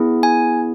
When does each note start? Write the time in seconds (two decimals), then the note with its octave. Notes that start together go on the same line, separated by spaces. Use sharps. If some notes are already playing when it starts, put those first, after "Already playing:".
Already playing: B3 E4 G#4
0.23 G#5